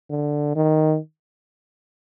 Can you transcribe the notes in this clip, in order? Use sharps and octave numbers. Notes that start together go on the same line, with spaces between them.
D3
D#3